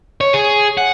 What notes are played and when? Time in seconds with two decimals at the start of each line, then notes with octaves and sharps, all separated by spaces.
0.21 C#5
0.34 G#4
0.78 F#5